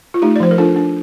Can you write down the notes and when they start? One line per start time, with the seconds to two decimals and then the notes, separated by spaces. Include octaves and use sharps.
0.14 F4
0.22 A3 D#4 G4
0.36 D5
0.40 F3 C5
0.51 A#4
0.58 D4 F4 A4
0.76 D4